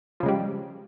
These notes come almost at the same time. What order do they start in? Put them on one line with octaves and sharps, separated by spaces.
F3 C#3 G#3 G3